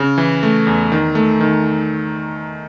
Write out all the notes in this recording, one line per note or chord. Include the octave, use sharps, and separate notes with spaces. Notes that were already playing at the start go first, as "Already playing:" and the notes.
Already playing: C#3
E3
A3
E2
D#3
A3
D#3